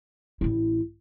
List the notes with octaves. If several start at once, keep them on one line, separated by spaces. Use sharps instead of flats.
A1 E4